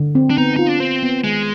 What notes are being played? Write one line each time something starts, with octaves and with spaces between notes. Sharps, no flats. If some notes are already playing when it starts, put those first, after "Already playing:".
Already playing: D3
C4
D4
B3 D#4
D#4 F4
D4
C4 C5
B3
D#3 G#3